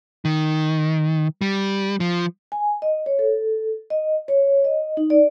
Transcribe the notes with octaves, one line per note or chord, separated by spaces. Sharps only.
D#3
G3
F3
G#5
D#5
C#5
A4
D#5
C#5
D#5
D#4
D5